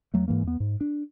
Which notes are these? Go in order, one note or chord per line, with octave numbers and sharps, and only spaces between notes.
E2 F#3 A3
G#2 E3 A#3
E2 B3
G#2
D4